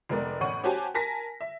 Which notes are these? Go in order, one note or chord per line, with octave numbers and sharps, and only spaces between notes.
F1 G#3 B3 A#4 D5
A1 C#4 F#5 C#6 D#7
C#4 F#4 G4 C5 G#5 A5
A#4 G#5 A5 A#6 B6
E5